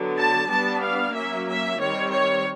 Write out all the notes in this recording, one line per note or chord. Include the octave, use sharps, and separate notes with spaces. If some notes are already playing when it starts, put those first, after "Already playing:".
Already playing: D3 F#3 B3
A5
G3 B3 D4 A5
F5
F#3 A#3 C#4 E5
E5
D#3 G3 C4 C#5
C#5